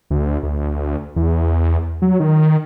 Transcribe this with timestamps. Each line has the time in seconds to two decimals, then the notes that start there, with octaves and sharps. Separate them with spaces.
0.10 D2
0.43 D2
1.16 E2
2.02 F#3
2.20 D#3